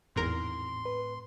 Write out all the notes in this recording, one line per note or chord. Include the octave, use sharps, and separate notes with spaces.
G#1 E2 A2 C4 A#4 C6
B4